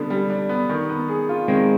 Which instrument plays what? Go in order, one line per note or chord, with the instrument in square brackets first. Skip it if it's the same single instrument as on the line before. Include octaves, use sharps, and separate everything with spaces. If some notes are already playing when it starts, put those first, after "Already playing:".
Already playing: [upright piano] D3 G3 B3 D4
G3
D4
B3
D#3
B3
G#4
F4
[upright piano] D#3 [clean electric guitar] G#3 C4